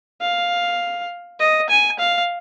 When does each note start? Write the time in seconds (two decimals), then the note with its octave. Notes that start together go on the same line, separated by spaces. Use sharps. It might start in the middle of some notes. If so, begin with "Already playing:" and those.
0.21 F5
1.40 D#5
1.69 G#5
1.99 F5